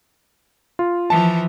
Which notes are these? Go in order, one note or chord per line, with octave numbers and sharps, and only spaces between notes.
F4
E3 F3 A5